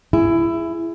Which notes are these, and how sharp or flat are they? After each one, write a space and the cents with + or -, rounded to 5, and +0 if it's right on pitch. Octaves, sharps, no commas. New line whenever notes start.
E4 +15 G#4 +0